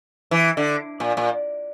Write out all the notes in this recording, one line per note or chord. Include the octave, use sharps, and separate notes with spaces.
E3
D3
A#2
A#2